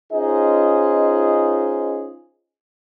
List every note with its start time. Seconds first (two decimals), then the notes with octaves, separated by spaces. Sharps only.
0.13 C#4 D#4 F4 G#4 C5 D#5